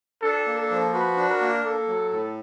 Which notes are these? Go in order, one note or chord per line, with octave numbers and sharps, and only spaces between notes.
D4 A4
A#3
A4
F3
F#4 B4
D4
A#4
A#3
A#3 A4
F#3
A2